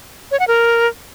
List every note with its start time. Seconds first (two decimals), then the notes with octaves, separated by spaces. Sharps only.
0.31 C#5
0.39 F#5
0.48 A#4